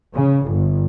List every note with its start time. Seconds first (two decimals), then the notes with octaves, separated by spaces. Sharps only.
0.15 C#3
0.51 G1